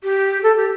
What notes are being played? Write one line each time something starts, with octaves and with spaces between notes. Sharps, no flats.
G4
A4
G4